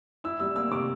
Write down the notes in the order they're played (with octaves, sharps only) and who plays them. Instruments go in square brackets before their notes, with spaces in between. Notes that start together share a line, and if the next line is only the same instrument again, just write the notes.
[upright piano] E4 E6
G3 E6
A#3 E6
C3 D6